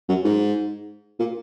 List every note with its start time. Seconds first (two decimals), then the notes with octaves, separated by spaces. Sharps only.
0.09 F#2
0.24 G#2
1.19 A#2